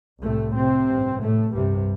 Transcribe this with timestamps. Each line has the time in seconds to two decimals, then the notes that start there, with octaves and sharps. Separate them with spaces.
0.21 C2 A2 C3 A3
0.55 C3 C4
0.87 A1 G2
1.21 A2 A3
1.53 C2 G2 C3 G3